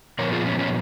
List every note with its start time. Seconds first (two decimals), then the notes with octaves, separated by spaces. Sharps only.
0.19 A#2 F3 B3 A#4 C#5
0.32 F4 G#4
0.46 C#4
0.59 C#4